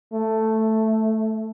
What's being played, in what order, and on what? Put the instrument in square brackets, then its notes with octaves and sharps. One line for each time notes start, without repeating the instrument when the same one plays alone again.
[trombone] A3